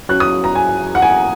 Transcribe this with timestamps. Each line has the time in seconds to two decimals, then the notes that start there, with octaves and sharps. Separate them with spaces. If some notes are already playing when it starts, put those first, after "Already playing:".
0.09 F#3 C#4 F#6
0.20 D#6
0.44 A#5
0.55 G#5
0.95 F#5
1.02 G#5